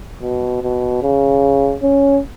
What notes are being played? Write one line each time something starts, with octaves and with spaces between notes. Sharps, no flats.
B2
B2
C#3
C#4